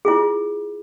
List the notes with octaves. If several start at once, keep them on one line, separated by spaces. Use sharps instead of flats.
E4 F4 G#4